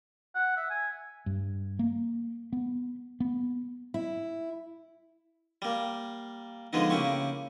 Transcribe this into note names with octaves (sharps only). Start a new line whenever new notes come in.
F#5
E5
G#5
G2
A#3
B3
B3
E4
G3 A#3
D3 F3 G#3 B3 D#4
C#3 A#3 E4 G4 C#6